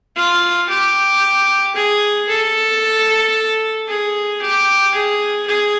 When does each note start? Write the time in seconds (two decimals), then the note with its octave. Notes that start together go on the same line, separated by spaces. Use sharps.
0.16 F4
0.69 G4
1.75 G#4
2.29 A4
3.88 G#4
4.41 G4
4.94 G#4
5.47 G#4